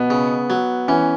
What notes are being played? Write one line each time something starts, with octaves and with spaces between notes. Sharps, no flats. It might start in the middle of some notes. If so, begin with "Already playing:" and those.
Already playing: B2 B3
C#3
F#3
E3 C#4